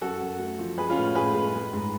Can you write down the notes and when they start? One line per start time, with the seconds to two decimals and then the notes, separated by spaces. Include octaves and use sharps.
0.01 F#2 F#4 A4
0.21 F#2
0.39 A3
0.59 F3
0.78 G#3 G#4 B4
0.90 C#4 F4
0.96 A2
1.15 A2 G#4 B4
1.34 G#3
1.54 G#3
1.73 G#2